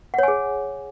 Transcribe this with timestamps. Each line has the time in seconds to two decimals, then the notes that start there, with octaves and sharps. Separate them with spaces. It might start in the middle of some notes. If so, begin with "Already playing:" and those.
0.14 F#5
0.18 C#5
0.23 G#5
0.28 G#4